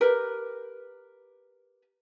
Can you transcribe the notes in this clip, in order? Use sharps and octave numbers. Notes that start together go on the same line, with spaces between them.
G4 A#4 B4